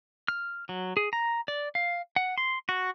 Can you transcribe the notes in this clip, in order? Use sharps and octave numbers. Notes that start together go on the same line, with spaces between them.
F6
F#3
G#4
A#5
D5
F5
F#5
C6
F#4